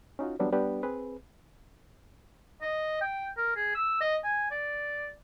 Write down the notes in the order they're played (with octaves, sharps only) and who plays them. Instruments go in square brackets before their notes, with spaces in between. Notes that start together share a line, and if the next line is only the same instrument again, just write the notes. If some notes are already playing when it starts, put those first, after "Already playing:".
[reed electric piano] C#4 D#4 F4 F#4
E3 F#3 G3 B3 D4
G3 B3 D4 G4 B4 D5
C4 G#4 B4
[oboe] D#5
G5
A#4
G#4
E6
D#5
G#5
D5